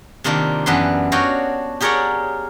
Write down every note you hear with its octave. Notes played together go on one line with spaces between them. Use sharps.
C3 D#3 A#3 D4 F4
F#2 E3 B3 D4 B4 C6
D4 F#4 C#5 D#5 F5 G5
G4 G#4 A#4 C#5 D5 F#5